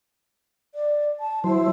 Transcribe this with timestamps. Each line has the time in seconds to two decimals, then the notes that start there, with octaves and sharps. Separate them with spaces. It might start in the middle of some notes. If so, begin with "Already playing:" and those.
0.75 D5
1.20 A5
1.44 F#3 E4 C5